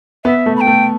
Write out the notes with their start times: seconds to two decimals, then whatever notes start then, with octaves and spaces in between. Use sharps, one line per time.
0.25 B3 E5
0.46 A3
0.56 B5
0.61 G5
0.67 A3